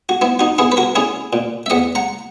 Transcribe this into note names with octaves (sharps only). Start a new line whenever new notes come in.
F#4
B3 E4
D#4 F#4
B3 E4 G#4
B4
F#4 A#4
C#4 E4 G#4
A#2
E5
E2 D#5 F#5
F#5 A#5